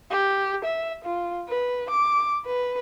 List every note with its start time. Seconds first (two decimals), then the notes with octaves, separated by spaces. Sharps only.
0.11 G4
0.65 E5
1.05 F4
1.49 B4
1.90 D6
2.46 B4